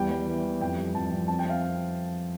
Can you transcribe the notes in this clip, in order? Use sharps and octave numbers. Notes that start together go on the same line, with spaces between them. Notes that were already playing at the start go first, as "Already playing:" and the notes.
Already playing: E2 G3 G5
G3
E3
E3
F2 G5
G3
F2 A5
F2
C4 A5
G5
C4 F5